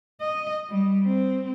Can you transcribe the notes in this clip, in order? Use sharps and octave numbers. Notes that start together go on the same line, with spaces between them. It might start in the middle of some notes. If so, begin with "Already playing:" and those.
D#5
G3
C4